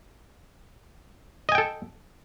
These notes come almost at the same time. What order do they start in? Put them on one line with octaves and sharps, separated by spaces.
D#5 G#5 G5 A4